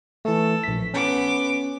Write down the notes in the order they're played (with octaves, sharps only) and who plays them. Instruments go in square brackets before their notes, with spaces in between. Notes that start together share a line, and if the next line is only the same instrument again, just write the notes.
[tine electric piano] E3 A3 [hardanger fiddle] A4
[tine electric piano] A#1 B6
[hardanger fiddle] B3 D6 [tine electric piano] C#4